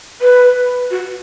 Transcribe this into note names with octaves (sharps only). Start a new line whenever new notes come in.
B4
F#4